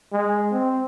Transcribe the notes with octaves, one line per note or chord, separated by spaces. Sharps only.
G#3
C4